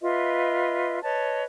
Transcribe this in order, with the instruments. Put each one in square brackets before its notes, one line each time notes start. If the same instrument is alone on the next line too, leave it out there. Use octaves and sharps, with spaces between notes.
[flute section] F4 B4 D#5 E5
B4 C#5 D#5 A5